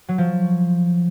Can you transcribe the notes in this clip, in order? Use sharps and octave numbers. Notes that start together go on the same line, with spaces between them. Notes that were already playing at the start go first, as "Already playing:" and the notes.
F#3
F3